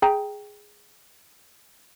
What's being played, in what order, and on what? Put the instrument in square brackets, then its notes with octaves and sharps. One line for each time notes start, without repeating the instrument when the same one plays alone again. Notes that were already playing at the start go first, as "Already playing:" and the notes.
[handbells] G#4 G5 A#5